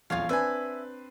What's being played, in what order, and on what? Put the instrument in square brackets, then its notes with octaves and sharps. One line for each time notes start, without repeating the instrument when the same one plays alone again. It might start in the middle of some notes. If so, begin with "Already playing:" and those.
[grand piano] D#1 A#1 E2 [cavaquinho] F4 C#5 F5
[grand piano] C4 D4 B4 [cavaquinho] E5 G#5